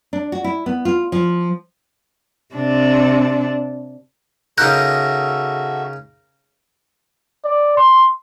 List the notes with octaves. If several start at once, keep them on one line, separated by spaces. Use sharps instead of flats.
D4
F#4
E4
B3
F4
F3
C3 D4
C#3 D#4 F#4 A4 A#4 E5 F#6 G6
D5
C6